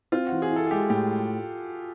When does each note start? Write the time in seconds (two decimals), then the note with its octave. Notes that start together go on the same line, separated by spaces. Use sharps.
0.12 C4 F4
0.27 F#4
0.32 E3
0.42 G#4
0.51 E4
0.56 A4
0.66 G#4
0.71 G#3 G4
0.90 A2 G4